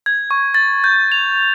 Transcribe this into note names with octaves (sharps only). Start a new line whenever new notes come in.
G#6
C#6
A6
G6
F7